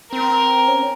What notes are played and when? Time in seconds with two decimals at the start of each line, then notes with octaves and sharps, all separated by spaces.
0.12 C4 A#4
0.68 C#4